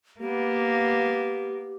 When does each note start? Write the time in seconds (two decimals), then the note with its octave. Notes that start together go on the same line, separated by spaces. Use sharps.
0.20 A#3 B3 G4